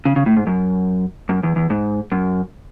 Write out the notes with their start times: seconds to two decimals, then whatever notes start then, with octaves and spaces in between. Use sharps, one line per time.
0.05 C#3
0.16 C#3
0.26 A2
0.37 G#2
0.47 F#2
1.29 F#2
1.43 E2
1.56 E2
1.70 G#2
2.12 F#2